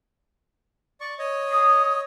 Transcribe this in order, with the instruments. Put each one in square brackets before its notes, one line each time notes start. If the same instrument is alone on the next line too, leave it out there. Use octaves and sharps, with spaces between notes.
[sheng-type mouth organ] D5 C#6
C#5 D#5
[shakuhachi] D#6